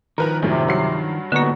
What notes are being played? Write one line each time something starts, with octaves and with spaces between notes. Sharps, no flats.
D#3 F3 A#4 B4 A#5
A#1 F#2 A2 C3
G2 F#3 C7
A2 D3 A#3 B3 D#4 F#4